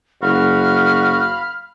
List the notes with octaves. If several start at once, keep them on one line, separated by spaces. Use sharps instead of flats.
F#1 F#4 F5 B5 F6